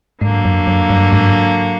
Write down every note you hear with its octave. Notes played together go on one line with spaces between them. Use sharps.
G#2 D3 F#3 A#3
F#2
F#2
G2
G#2